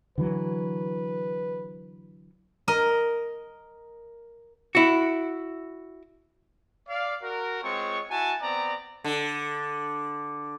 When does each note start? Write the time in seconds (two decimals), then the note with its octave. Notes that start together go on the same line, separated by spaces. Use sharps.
0.18 D3 E3 F#3 B4
2.68 A#4 D#5
4.75 E4 F#4
6.88 D5 F5
7.22 F#4 A#4
7.61 G#3 C4 F4 C#5 C#6
8.10 E4 F#4 G#5 A5
8.41 B3 C4 D5 A#5
9.04 D3